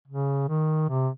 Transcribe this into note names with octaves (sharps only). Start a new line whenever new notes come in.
C#3
D#3
C3